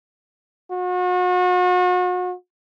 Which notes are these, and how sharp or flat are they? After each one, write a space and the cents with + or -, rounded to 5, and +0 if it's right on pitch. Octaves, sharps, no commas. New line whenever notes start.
F#4 -40